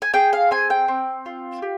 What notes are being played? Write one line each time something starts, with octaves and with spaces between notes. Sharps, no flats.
G#5
G#4 G5
F5
C4 G#5
G5
C4
F4
G4